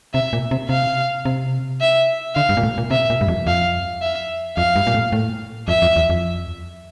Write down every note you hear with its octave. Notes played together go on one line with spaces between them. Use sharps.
C3 E5
A#2
C3
C3 F5
C3
E5
D3 F5
G2
A#2
A2
A#2
C3 E5
A#2
G2
F2
F2 F5
E5
F2 F5
G2
A#2
A2
A2
F2 E5
F2
E2
F2